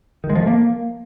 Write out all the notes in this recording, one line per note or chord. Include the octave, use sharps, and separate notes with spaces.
D#3
G#3
F3
A3
A#3